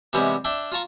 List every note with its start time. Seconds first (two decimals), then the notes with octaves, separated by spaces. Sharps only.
0.13 C3 E3 G3 G#3 B3 C#4
0.45 D4 E5 G5
0.72 F4 F5 A5 A#5 C#6